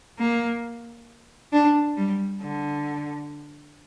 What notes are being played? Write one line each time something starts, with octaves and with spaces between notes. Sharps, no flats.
A#3
D4
G3
D3